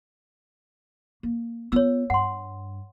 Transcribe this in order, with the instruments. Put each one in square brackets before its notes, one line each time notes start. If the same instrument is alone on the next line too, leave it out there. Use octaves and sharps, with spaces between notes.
[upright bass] A#3
[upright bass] B3 F4 [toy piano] C#5 E6
[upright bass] G2 [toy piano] F#5 C6